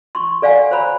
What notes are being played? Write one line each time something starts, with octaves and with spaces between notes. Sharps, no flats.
C6 C#6
A4 D5 F5 F#5 G#5
C5 C#5 A#5 B5